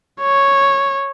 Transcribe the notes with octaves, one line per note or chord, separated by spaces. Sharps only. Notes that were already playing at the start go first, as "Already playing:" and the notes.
C#5